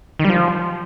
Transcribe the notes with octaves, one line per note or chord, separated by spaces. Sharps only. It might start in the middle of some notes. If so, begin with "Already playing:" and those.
D#3
G3
F3